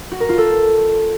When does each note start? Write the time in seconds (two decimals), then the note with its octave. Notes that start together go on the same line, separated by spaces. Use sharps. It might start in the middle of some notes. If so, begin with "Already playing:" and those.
0.12 F#4
0.20 A#4
0.29 F4
0.38 A4